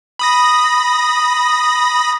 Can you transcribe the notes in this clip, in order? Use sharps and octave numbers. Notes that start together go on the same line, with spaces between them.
B5 D#6 A#6